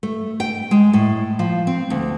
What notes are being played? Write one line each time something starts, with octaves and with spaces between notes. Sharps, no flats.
A3
G5
G#3
A2
F3
C4
D2